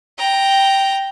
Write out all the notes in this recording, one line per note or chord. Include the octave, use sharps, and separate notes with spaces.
G5 A#5